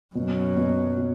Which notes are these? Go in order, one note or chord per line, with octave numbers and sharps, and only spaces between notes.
F#2 B2
B2
B2